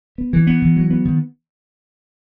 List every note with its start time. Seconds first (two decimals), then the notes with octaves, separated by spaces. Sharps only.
0.18 B3
0.33 E3
0.47 B3
0.62 E3
0.77 F#3
0.90 B3
1.05 D#3